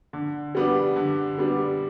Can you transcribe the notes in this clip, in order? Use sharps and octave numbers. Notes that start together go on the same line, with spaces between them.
D3
G3 B3 D4
D3
G3 B3 D4